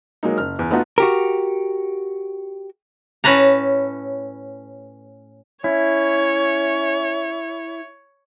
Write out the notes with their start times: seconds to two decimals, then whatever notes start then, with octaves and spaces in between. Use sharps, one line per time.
0.23 F#3 G#3 A#3 D#4
0.38 F#1 F6
0.59 E2
0.70 A3 B3 D#4 F4 F#4
0.98 F#4 G4 A#4
3.24 A2 C#4 B4 A5 A#5
5.64 C#4 E4 C#5